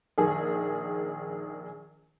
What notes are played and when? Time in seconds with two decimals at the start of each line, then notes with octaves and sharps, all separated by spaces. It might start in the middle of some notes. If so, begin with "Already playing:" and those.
0.18 A#1 D#3 G#4